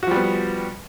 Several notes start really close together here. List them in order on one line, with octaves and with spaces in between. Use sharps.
F#4 F3 G3 B3